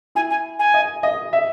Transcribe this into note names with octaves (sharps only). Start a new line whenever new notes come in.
E4 G#5
G#5
G#5
D#5
D#5
E5